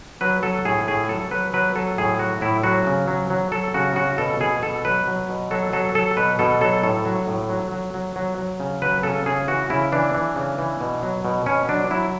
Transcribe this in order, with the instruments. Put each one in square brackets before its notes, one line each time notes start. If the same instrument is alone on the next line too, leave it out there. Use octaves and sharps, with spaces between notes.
[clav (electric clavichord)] F#3 B4
F#3 A4
A2 G#4
A2 G#4
F#3 A4
F#3 B4
F#3 B4
F#3 A4
A2 G#4
F#3 F#4
A2 E4
F#3 F#4
C#3
F#3
F#3
F#3 A4
C#3 F#4
C#3 F#4
B2 A4
B2 G#4
B2 A4
F#3 B4
F#3
B2
F#3 A4
F#3 A4
F#3 A4
B2 B4
B2 A4
F#3 A4
A2 A4
F#3
A2
F#3
F#3
F#3
F#3
F#3
C#3
F#3 B4
C#3 A4
C#3 G#4
E3 F#4
C#3 E4
E3 D4
E3
C#3
E3
B2
F#3
B2
B2 C#4
F#3 D4
F#3 E4